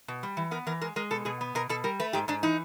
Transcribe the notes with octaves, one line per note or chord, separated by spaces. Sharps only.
B2
G3
E3
B3 A#4
E3 A#4
G#3 A#4
G#3 A#4
B2 A4
B2 G#4
B3
B2 A#4
B2 A4
G3 A#4
A3 B4
G#2 G4
G#2 D4
E3 D#4